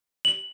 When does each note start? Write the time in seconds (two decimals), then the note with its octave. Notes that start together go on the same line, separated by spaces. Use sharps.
0.25 F#7